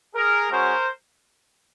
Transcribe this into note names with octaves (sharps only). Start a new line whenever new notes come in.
G#4 A#4
G#3 C#4 F#4 A#4 C5